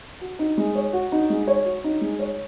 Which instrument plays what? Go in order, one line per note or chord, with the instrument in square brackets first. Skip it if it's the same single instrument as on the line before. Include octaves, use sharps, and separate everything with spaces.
[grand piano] F#4
D#4
G#3
C#5
F#4
D#4
G#3
C#5
F#4
D#4
G#3
C#5